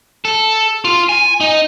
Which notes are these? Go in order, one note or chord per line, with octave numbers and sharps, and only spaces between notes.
A4
F4
G#5
D#4